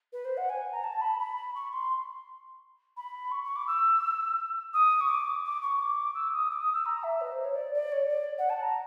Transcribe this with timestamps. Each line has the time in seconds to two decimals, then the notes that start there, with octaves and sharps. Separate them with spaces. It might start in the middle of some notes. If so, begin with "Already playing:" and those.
0.12 B4
0.24 C5
0.37 F#5
0.49 G#5
0.73 A#5
0.83 A5
1.01 B5
1.19 B5
1.55 C#6
1.73 C6
2.96 B5
3.31 C#6
3.44 C#6
3.55 D6
3.67 E6
4.73 D#6
5.00 C#6
5.08 D6
5.44 D6
5.61 C#6
5.79 D6
6.14 E6
6.32 D#6
6.50 D6
6.61 D#6
6.73 E6
6.85 A#5
7.03 E5
7.20 B4
7.32 C5
7.44 C#5
7.55 D5
7.73 D5
7.91 C#5
8.08 D5
8.38 F#5
8.49 A5
8.62 A#5